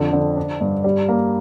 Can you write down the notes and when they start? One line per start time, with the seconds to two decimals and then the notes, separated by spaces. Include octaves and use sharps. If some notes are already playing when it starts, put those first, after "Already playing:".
Already playing: F2 D3
0.13 D3
0.37 D4
0.61 G2
0.84 G3
1.09 A#3